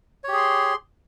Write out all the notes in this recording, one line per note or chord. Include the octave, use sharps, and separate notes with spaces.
G4 G#4 C#5 C6